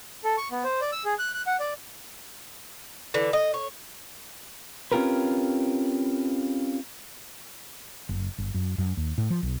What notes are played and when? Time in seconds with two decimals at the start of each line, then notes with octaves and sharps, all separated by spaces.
0.24 A4
0.37 C#6
0.51 B3
0.64 C5
0.81 D5
0.92 E6
1.05 G#4
1.19 F#6
1.34 F#6
1.47 F#5
1.60 D5
3.14 D3 E3
3.33 D#5
3.54 C#5
4.92 C4 C#4 F4 G4 A#4 B4
8.09 F#1
8.38 G1
8.54 F#2
8.78 F#2
8.97 D#2
9.18 A2
9.30 F3
9.43 B1